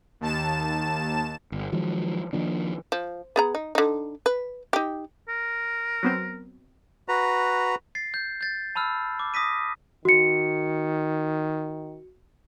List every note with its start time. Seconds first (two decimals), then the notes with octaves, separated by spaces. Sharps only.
0.21 D#2 A5 E7
1.52 G1
1.72 D#3 F3 F#3 G#3
2.33 D#3 F3 A#3 D4
2.92 F3
3.36 B3 G#4 A#5
3.55 D#4
3.75 D3 D#4
4.26 B4
4.73 D#4 G4
5.29 A#4
6.03 F#3 B3 C4
7.09 F#4 B4 A#5
7.95 A6 C7
8.14 G6
8.41 G6 A6
8.75 A5 B5 E6 F6
9.19 D6
9.34 D6 D#6 A#6 B6 D#7
10.05 D#3 F#4 C#7